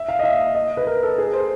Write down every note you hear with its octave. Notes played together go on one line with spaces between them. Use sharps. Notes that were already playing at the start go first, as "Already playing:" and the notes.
Already playing: E5
F5
D#5
E5
D#5
B4
A#4
A4
G#4
C5